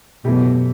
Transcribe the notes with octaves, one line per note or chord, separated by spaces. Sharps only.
F#2 B2 E3 A3 E4 G4